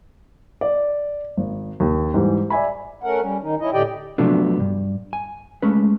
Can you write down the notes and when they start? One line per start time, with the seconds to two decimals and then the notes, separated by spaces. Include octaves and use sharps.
0.61 D5
1.37 G#1
1.80 D#2
2.14 G#2 E3 G3
2.50 D5 E5 G#5 B5
3.03 A3 C#4 A#4 F#5
3.22 G3 C#4
3.42 D#3 D#4
3.60 C#4 E4 D#5
3.73 A2 D3 G4 D5 D#5 G5
4.18 C3 F3 F#3 A3 B3 D4
4.60 G2
5.13 G#5
5.62 G#3 A3 C#4 B4